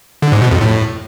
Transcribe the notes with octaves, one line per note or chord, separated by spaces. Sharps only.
D3
G#2
B2
F2
A2